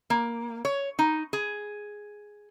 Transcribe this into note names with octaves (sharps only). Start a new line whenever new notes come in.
A#3
C#5
D#4
G#4